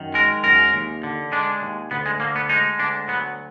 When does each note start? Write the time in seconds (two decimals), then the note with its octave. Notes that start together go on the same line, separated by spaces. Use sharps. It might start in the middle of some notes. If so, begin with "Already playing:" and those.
Already playing: F#2 D#3
0.14 G#3 A#4
0.44 F#2 A#4
0.73 D#2
1.03 D3
1.32 G#3 D4
1.62 D#2
1.91 D2 B3
2.06 G#3
2.20 D3 A#3
2.36 B3
2.49 G#3 D#4
2.79 D2 D4
3.08 F#3 B3